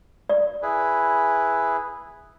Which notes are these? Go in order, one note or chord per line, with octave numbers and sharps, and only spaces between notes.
D5
E4 G#4 B4